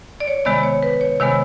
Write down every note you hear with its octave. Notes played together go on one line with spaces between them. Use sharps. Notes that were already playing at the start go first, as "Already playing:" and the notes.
D5
C#5
C3 D#3 G#3 B3 D5
C#5
B4
C#5
C3 D#3 G#3 B3 C#5